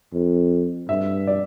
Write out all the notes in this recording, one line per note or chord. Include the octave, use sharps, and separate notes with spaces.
F2
G2 E5
D5